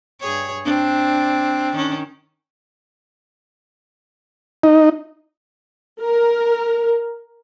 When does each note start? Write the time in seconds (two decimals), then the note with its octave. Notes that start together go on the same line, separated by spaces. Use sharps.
0.21 G2 G#4 C#5
0.65 C4 D4
1.73 D#3 C#4
4.63 D#4
6.01 A#4